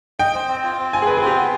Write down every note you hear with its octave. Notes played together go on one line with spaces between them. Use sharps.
D#5 G5
C5
C4
F4
C4
F4 G#5
G#4
C4 B4
G#4
F4 G4
B3